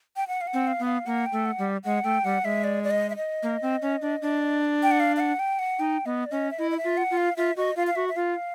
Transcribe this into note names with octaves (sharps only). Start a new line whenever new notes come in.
G5
F#5
F5
F#5
C4
F5
B3
F5
A#3 F#5
G5
A3
F#5
G3
G#3 F#5
A3 G5
G3 F#5
G#3 E5
D5
D5
D#5
E5
D#5
A#3
C4
C#4
D4
D4
G5
F#5
F5
F5
F#5
G5
F#5
D#4 G5
B3 D#5
D5
C#4 D#5
E5
E4 D#5
D#5
E5
F4
F#5
F4
F5
F4 E5
F#4 D#5
F4 F5
F5
F#4 E5
E5
F4 F5